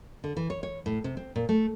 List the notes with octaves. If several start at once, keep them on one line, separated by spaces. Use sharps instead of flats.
D3
E3
C#5
C#5
A2
C3
C4
A#2
A3